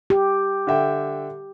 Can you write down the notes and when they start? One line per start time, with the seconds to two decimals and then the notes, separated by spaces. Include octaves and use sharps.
0.10 G4
0.67 D3 E5 G5